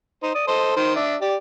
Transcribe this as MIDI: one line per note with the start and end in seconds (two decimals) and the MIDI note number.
0.23 0.31 63
0.23 0.31 72
0.35 0.47 74
0.35 0.47 87
0.48 0.72 69
0.48 0.72 72
0.48 0.72 75
0.76 0.95 51
0.76 0.95 72
0.96 1.16 62
0.96 1.16 76
1.22 1.35 67
1.22 1.35 74